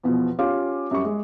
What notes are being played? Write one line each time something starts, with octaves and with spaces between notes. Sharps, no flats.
E2 B2 F3
C#4 F4 G4 F5 D6
F#2 G3 C#6
G#3